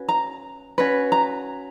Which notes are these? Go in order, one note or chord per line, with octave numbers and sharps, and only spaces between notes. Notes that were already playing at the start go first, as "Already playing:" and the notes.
Already playing: C#4 F#4 B4
A#5
C#4 F#4 B4
A#5